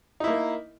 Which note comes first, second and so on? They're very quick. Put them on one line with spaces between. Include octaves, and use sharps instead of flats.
D#4 E4 A#3